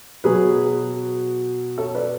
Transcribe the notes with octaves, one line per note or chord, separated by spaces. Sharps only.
B2 F#3 G#4 B4
A4 C#5
B4 D5